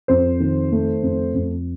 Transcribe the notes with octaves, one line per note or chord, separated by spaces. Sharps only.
F2 C5
D#3
A3
F2
F2